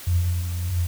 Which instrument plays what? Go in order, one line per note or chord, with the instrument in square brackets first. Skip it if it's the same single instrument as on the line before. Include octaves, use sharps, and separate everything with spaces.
[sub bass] F2